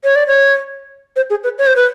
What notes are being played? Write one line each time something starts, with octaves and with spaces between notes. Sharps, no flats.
C#5
D5
C#5
C5
G#4
B4
C#5
C5
B4